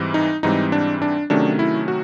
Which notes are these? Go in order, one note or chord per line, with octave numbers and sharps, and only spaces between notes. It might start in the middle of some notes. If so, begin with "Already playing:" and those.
Already playing: G#2 E3 G3 C4
D#4
G#2 E3 G3 C4 D#4
D4
D4
C3 D#3 F#3 A3 C#4 D4
E4
F#4